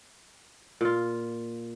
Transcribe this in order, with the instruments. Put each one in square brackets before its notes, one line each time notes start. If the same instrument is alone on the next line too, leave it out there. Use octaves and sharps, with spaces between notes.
[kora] A#2 F4